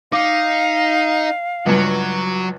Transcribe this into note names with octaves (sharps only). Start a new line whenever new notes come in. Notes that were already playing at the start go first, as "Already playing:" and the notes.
D#4 F5 D6
C#2 G2 F#3